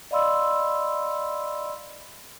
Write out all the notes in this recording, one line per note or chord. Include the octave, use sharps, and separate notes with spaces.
D5 D#5 F5 B5 C6 E6